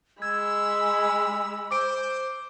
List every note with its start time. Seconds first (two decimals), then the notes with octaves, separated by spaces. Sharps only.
0.22 G#3 B5 E6 G#6
1.71 C5 D6 D7